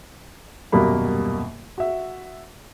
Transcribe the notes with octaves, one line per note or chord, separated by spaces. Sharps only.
D#1 F#2 B2 G3 A#3 B5
F#4 E5